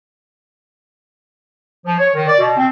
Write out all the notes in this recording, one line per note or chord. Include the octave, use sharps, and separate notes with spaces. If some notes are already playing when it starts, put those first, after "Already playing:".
F3
C#5
D#3
D5
B2
C4